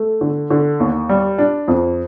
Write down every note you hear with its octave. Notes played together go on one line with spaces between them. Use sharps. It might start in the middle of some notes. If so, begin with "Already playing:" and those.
Already playing: A3
D3
D3
D#2
G3
D4
F2